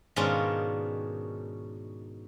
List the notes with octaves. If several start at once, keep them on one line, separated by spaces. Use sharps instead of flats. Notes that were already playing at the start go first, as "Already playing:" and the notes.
G#2 B2 D#3 C#4 D4 F4